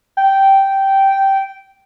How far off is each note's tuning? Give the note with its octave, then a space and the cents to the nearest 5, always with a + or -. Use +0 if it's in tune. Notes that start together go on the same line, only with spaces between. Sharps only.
G5 -10